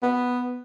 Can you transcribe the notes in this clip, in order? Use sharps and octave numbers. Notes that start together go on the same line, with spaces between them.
B3